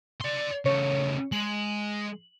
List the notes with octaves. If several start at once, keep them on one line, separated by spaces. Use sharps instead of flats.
D5 C6
C#3 A3 C#5
G#3 F#7